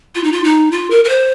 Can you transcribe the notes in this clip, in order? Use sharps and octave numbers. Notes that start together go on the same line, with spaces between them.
F4
D#4
F4
D#4
F4
A#4
A#4
C5